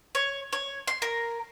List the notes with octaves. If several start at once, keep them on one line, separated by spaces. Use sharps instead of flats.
C#5
C#5
C6
A#4